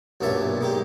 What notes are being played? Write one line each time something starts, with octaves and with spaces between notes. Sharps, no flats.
B1 G2 A#2 C#4 E5 A5
G#3 D#4 G4